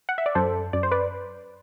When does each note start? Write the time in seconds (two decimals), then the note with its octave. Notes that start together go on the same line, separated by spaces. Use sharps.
0.09 F#5
0.18 E5
0.26 D5
0.35 F#2 A4 C5
0.73 F#2 D5
0.83 C5
0.92 B4 D5